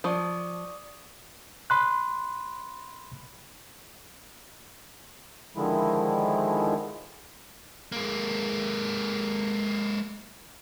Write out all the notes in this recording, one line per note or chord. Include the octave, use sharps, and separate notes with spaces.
F3 D5 C#6 D#6
B5 C6 F#6
D3 D#3 F3 G#3 E4
G#3 A#3